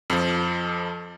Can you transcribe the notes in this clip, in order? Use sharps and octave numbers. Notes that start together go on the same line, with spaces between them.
F2 F3